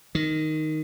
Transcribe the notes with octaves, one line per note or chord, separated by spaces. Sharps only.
D#3